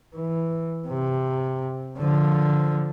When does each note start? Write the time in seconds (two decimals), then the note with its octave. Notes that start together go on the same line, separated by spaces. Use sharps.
0.15 E3
0.88 C3
1.98 D3 F3